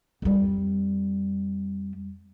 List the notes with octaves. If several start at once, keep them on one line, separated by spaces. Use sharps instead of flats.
F2 G3